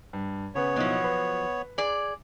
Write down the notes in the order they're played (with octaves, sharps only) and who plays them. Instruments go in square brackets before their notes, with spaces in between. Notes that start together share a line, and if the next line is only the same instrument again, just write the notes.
[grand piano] G2
[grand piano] C#3 B4 [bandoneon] B3 C#5
[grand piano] B2 D#4 E4 [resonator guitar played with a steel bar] F3 F#3
[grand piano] B4 B5
[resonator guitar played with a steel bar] G#4 D5